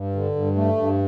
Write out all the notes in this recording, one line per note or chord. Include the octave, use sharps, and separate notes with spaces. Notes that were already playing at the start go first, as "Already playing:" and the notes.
Already playing: G2
D3
G2
A3
G2